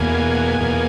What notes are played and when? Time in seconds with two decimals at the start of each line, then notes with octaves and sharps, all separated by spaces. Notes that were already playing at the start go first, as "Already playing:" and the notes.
Already playing: E2 B2 A#3 G#5
0.60 E2 B2 A#3